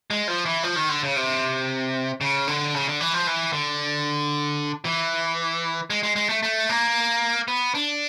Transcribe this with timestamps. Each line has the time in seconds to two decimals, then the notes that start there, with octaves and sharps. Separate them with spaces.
0.10 G#3
0.28 F3
0.46 E3
0.63 F3
0.76 D#3
0.89 D3
1.03 C#3
1.16 C3
2.21 C#3
2.47 D3
2.74 C#3
2.87 D3
3.01 E3
3.14 F3
3.27 E3
3.53 D3
4.85 E3
5.90 G#3
6.03 G#3
6.16 G#3
6.29 A3
6.43 A3
6.69 A#3
7.48 B3
7.74 D4